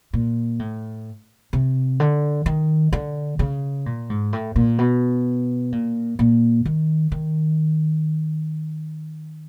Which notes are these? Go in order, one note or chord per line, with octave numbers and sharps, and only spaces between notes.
A#2
A2
C3
D3
D#3
D3
C#3
A#2
G#2
A2
A#2
B2
A#2
A#2
D#3
D#3